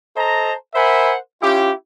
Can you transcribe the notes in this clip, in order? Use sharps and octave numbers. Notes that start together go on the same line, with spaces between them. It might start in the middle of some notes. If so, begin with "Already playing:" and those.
A4 C5 D#5 A5 A#5
A#4 C5 E5 F#5 G#5 B5
C#4 E4 F4 G4